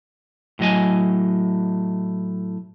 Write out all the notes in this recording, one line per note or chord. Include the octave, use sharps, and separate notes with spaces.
A2 F#3 D#5 G#5